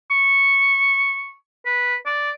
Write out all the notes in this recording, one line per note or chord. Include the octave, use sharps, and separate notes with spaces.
C#6
B4
D5